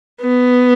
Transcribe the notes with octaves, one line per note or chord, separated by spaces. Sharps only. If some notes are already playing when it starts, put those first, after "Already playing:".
B3